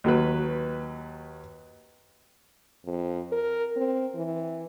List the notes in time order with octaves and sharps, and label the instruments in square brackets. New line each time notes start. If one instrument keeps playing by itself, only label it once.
[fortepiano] D#2 F#3 B4
[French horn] F2
A#4
C4
E3